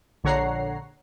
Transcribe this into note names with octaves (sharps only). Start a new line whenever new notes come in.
A#1 D3 C#5 F#5 A#5 C7